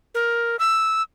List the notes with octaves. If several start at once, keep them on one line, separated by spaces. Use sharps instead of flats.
A#4
E6